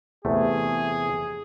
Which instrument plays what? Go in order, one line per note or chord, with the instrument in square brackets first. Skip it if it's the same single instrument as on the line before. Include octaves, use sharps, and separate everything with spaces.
[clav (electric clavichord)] E2 C3 A3 [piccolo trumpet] G#4